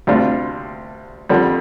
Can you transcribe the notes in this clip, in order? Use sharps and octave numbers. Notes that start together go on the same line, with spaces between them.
D2 C3 G3 D4 F4
F2 D3 G3